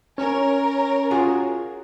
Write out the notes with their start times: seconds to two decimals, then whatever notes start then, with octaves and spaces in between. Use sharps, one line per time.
0.18 C#4 A#4 C#5
1.11 F4 F#4 G#4